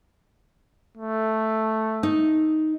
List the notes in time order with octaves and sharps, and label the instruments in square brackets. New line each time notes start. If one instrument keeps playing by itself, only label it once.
[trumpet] A3
[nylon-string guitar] D#4